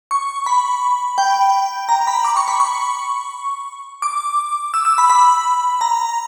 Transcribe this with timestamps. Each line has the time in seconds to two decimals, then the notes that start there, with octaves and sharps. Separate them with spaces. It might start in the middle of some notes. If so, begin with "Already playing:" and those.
0.11 C#6
0.46 B5
1.18 G5
1.89 A#5
2.07 B5
2.25 D6
2.36 C#6
2.48 B5
2.60 C#6
4.02 D6
4.74 E6
4.85 E6
4.98 B5
5.10 B5
5.81 A#5